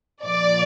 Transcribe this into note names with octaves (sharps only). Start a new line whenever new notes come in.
A#2 F3 D5